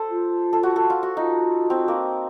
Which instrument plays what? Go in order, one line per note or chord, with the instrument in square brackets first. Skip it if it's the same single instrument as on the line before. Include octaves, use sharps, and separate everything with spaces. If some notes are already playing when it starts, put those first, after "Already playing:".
Already playing: [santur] A4 C5
[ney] F4
[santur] A4
F#4
A4
F4
F#4
[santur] D#4 [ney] F4
[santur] C4
A#3